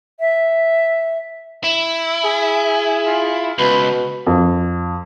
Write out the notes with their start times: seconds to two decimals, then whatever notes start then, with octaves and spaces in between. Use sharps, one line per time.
0.20 E5
1.64 E4
2.24 G#4 G#5
3.06 F4
3.58 C#2 B2 B5
4.27 F2